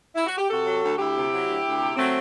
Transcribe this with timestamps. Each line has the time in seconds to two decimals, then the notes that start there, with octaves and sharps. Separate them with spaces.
0.15 E4
0.26 F#4
0.38 G4
0.50 C3 F#4 A4
0.66 F#3
0.82 D2
0.98 D2 E4 G4
1.15 C3
1.32 F#3
1.48 D2
1.63 D2
1.80 C3
1.96 F#3 A3 C4